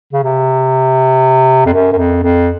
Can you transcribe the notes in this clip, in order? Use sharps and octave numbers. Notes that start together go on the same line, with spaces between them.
C#3
C3
F2
F#2
F#2
F2
F2